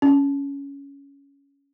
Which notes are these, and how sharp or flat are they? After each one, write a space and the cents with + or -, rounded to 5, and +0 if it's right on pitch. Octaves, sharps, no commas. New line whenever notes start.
C#4 +10